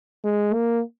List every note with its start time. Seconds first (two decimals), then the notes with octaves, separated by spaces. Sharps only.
0.24 G#3
0.54 A#3